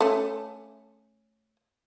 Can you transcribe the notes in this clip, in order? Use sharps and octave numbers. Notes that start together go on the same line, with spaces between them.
A3 C#4